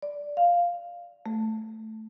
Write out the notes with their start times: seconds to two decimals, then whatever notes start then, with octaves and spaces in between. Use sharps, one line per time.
0.02 D5
0.37 F5
1.26 A3